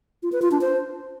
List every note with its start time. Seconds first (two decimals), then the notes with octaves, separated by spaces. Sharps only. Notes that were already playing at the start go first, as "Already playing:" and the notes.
0.23 F4
0.32 B4
0.42 F4
0.52 D4
0.61 C5